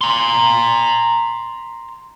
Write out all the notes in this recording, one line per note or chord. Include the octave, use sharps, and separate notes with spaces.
A#5 C6